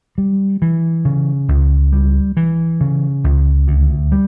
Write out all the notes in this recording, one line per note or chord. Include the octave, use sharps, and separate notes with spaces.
G3
E3
C#3
C#2
G3
E3
C#3
C#2
D2
G3